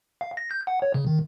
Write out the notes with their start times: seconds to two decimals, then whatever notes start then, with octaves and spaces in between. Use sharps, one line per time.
0.21 F5
0.37 A#6
0.51 G6
0.67 F#5
0.82 C#5
0.94 C#3
1.07 D#3